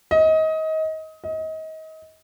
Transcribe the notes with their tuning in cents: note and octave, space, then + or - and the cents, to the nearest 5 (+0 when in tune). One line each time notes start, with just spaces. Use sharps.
D#5 +25
D#5 +30